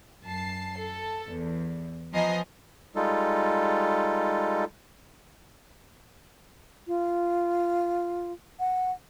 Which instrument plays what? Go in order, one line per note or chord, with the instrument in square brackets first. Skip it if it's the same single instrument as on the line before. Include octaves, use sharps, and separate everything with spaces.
[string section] F#2 A5 C7
A4
E2
F3 B3 D#5 G#5 A#5 C7
[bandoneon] G3 G#3 D#4 F4 A4
[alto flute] F4
F#5